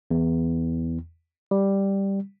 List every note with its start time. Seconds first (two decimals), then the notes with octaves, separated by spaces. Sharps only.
0.11 E2
1.51 G3